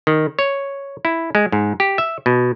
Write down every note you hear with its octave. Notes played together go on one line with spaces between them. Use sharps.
D#3
C#5
E4
G#3
G#2
G4
E5
B2